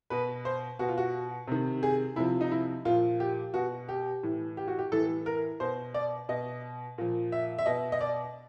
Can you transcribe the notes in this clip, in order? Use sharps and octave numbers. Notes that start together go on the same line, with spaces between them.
B2 B4
C5
B2 F#4
F4
F#4
C3 D#3
G#4
C3 F3 E4
D#4
E4
A#2 F3 F4
G4
B2 F#4
G4
A2 E3
G4
F#4
G4
A2 E3 A4
A#4
B2 C5
D5
B2 D#5
A#2 F3
E5
E5
B2 D#5
D#5
D5